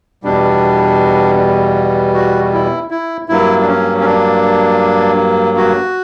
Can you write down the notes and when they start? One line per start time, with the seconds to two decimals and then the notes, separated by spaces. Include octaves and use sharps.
0.23 E2 B2 G3 D4
2.14 F#4
2.53 E4
2.91 E4
3.29 G2 F#3 A#3 E4
3.61 D4
3.67 C#4
4.01 C#4
4.05 D4
5.57 F#4